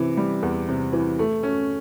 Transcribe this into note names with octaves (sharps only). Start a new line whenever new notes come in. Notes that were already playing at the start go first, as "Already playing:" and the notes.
Already playing: C3 E3
G3
E2
C3
E3
A3
C#4